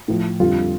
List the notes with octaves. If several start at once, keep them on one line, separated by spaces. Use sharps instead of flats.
A2 F3
F2 D3 G3 F4